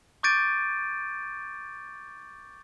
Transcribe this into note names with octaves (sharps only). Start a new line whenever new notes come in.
C#6 D6 G6 A6 D7 D#7